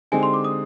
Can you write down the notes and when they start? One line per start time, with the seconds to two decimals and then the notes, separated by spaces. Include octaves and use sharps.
0.12 D3 G#3 C4 D#4 G4 G#5
0.23 C6
0.34 D6
0.44 D#6